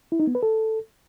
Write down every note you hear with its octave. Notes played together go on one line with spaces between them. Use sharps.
E4
D#4
B3
B4
A4